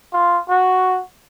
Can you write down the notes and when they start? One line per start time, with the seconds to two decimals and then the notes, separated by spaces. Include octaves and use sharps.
0.13 F4
0.49 F#4